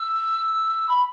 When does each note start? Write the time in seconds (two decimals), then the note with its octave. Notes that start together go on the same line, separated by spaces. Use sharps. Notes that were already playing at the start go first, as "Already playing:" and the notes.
Already playing: E6
0.89 B5